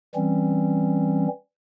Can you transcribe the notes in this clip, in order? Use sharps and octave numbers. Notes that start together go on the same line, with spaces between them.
E3 G3 C4 C#4